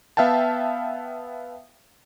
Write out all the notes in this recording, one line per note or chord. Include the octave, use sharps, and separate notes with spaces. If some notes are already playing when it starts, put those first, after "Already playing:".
B3 E5 F5 G5 A5